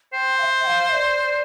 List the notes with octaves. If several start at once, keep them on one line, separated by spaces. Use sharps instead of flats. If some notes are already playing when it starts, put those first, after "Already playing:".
C5 G5
F5
E5
G5
F5
E5
D5
D5